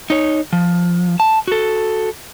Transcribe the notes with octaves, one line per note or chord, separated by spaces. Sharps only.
D#4 C#5
F3
A5
F#4 A4